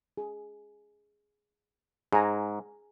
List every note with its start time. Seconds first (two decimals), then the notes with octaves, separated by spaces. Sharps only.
0.17 G#4
2.13 G#2 G#4 G#5 A#5